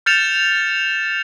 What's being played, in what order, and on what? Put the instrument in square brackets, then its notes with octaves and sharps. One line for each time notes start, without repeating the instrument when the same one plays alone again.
[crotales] F6 G6 A6 C#7 E7 F7